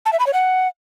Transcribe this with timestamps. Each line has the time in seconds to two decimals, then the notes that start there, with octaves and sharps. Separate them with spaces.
0.06 A5
0.13 E5
0.20 B5
0.26 C#5
0.33 F#5